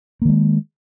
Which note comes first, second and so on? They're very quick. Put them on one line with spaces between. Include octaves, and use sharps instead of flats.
A#3 D#3 G#3